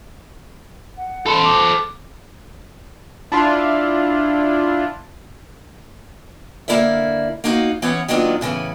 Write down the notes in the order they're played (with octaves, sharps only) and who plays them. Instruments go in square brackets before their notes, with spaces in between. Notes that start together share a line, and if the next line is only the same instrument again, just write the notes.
[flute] F#5
[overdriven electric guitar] A4 C5 [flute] B5
[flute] D6
[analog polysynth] D4 E4 F4
[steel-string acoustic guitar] D3 A#3 E4 A#4 D5 E5
A#3 B3 D#4 F#4 F5
E3 B3 C#4 C#5 F#5
D#3 F#3 A#3 B3 D4 F4
A2 C#3 E3 B3